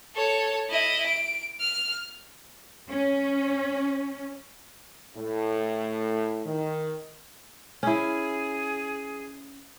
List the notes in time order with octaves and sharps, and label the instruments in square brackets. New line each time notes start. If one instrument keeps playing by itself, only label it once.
[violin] A4 C#5
E4 D#5
D7
F6
[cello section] C#4
[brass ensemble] A2
D#3
[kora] C#4 E4 [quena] G#4